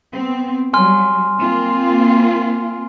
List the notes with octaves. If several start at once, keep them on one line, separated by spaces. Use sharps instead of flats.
B3 C4
F#3 G3 G#5 C6 F6
A#3 C4 F4